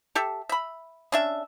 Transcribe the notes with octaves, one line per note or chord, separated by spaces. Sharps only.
G4 A4 E5
E5 B5
C#4 D4 E5